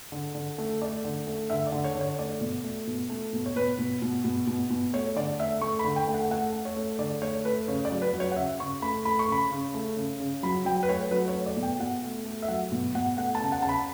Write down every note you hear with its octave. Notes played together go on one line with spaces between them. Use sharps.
D3
D3
A3
A3 D5
D3
A3
D3 E5
D5
D3
C#5
D3
C#5
A3 D5
B2
A3
B2
A3
B2
C#5
B2 B4
B2
B2
B2
B2
B2
A3 C#5
D3 D5
A3 E5
A3 C#6
B5
D3
G5
A3
F#5
A3 F#5
A3
C#5
A3
D3 D5
A3 C#5
A3 B4
C#3 C#5
D5
F#3
B4
F#3
C#5
F#5
C#3 E5
C#3 C#6
A3 B5
A3 B5
C#6
C#3 B5
C#3
A3
C#3
C#3
F#3 B5
F#3 G5
B4
A3 C#5
F#3 B4
C#5
A3
D5
B2
G5
B2 F#5
A3
A3
E5
F#3 F#5
B2
B2 F#5
A3 F#5
A5
C#3
F#5
C#3 A5
B5